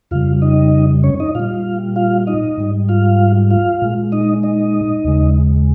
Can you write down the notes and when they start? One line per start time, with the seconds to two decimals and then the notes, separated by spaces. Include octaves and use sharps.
0.11 F2 C#3 G3 F4 F5
0.42 D#4 D#5
1.04 C#4 C#5
1.20 D#4 D#5
1.35 A#2 G3 F4 F5
1.96 F4 F5
2.27 D#4 D#5
2.58 G#2 G3
2.89 F4 F5
3.51 F4 F5
3.82 A#2 G#3
4.12 D#4 D#5
4.43 D#4 D#5
5.05 D#2 C#3 G#3